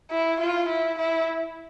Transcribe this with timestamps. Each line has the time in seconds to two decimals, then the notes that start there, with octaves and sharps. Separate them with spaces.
0.11 E4
0.40 F4
0.69 E4
0.98 E4